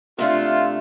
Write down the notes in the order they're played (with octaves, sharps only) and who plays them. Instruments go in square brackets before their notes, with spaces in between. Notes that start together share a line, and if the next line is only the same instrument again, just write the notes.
[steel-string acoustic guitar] C3 A3 D4 [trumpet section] F4